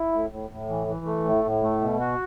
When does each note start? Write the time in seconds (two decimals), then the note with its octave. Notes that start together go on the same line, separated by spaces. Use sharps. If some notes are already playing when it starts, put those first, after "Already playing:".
Already playing: E4
0.12 A2
0.31 A2
0.50 A2
0.68 E3
0.87 E3
1.06 A3
1.24 A2
1.44 A2
1.63 A3
1.81 B2
2.00 F#4